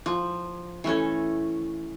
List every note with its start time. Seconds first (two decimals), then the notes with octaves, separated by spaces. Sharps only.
0.06 F3
0.84 E3 A3 C#4 A4